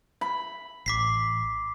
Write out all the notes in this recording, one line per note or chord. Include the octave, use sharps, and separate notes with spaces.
B5
A1 D6 B6 C7